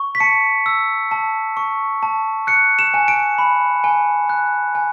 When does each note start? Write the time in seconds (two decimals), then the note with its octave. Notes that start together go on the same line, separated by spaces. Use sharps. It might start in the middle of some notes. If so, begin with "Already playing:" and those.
Already playing: C#6
0.15 B6
0.20 A5 C#7
0.66 E6
1.11 A5
1.57 C#6
2.03 A5
2.47 F#6 C#7
2.79 E7
2.94 G#5
3.08 D7
3.38 B5
3.84 G#5
4.29 F#6
4.75 G#5